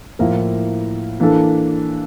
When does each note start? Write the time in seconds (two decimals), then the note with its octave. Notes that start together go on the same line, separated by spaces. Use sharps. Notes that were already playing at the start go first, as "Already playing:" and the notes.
0.19 A2 F3 A#3 E4 A#4
1.20 E3 A#3 D4 A4